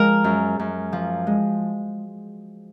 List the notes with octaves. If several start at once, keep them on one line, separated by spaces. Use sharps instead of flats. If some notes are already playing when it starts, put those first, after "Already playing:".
Already playing: F3 G#3 A#4
F#2
F#2
F3
G#3